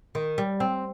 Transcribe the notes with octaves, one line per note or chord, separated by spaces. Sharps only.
D#3
G3
C4